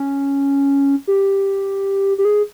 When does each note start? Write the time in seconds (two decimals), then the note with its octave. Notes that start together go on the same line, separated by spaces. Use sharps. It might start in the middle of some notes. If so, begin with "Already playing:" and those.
Already playing: C#4
1.07 G4
2.18 G4
2.25 G#4